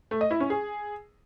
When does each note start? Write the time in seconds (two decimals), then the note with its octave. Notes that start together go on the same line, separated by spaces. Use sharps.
0.11 A3
0.21 D#5
0.31 E4
0.40 C#4
0.50 G#4